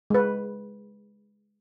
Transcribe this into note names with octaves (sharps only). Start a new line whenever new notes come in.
G#3 B4